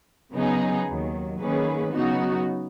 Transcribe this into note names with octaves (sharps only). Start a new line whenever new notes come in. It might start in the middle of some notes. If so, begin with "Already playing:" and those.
C#3 F#3 B3 D#4 G#4
D#2 D#3 F#3
D#3 A#3 C#4 G#4 B4
C#3 F#3 B3 D#4 F#4